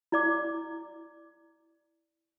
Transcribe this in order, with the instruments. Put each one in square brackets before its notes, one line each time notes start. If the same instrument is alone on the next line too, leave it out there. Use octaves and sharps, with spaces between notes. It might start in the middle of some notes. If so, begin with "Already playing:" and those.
[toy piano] E4 D5 D6